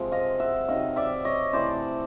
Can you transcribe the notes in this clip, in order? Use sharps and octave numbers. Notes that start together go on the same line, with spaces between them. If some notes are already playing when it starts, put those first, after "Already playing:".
Already playing: C3 F3 G#3
D#5 F5
E5 F#5
C3 D#3 F#3 D#5 F5
D5 E5
C#5 D#5
C3 E3 A3 C5 D5